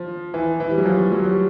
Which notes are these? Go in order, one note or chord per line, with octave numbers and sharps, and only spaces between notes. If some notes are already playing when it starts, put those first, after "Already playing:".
Already playing: F3
E3
E3
G3
F#3
F3
F#3
G3